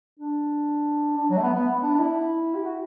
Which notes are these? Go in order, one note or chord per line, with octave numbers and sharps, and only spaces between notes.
D4
D4
F#3
A3
B3
B3
D4
D4
E4
G4
F#4